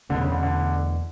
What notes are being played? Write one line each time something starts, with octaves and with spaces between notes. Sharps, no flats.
E2 B2 D3 A3
C#3
D3
D3